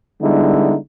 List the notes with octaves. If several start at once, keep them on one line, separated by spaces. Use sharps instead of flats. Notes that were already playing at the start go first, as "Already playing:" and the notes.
D3 G3 G#3 B3 D#4 E4